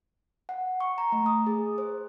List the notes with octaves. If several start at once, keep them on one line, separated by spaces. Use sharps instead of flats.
F#5
C#6
A#5
A3
D#6
G#4
C5